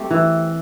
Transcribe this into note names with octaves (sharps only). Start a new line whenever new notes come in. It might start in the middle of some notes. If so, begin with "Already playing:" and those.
Already playing: A3 C4 G4
E3